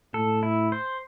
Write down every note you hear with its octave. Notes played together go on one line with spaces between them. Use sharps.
A2 A4
E4
C5